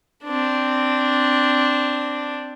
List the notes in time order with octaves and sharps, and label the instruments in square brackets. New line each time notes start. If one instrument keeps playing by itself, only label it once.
[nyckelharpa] C4 D4